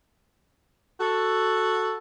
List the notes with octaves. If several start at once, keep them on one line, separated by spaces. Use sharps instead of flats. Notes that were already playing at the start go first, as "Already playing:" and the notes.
F#4 A4